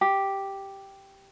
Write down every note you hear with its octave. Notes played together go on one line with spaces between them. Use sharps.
G4